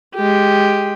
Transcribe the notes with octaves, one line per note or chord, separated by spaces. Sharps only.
G#3 G4